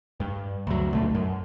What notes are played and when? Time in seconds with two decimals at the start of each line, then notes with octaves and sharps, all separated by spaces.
0.20 G2
0.67 D2 F#3
0.91 D1 B1 A3
1.15 F#2